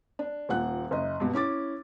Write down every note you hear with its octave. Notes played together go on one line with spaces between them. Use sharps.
D4
D#1 A#2 F#5 F#6
F#1 D#5
G2 B2
C#4 E4 D6 A6